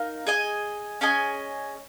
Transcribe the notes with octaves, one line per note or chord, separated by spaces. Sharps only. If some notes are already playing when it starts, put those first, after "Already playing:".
Already playing: D#4 A#4 F5
G#4 D#5 G#5
C#4 G#4 D#5 G#5